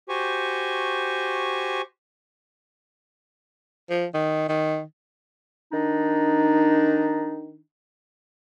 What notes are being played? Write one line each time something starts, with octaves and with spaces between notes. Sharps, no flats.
F#4 G4 C5 G#5 C#6
F3
D#3
D#3
D#3 D4 D#4